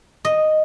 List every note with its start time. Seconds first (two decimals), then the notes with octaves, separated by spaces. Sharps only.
0.25 D#5